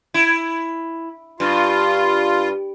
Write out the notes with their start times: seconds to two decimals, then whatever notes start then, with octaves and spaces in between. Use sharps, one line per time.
0.14 E4
1.40 G2 F4